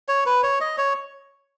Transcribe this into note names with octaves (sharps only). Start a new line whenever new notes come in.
C#5
B4
C#5
D#5
C#5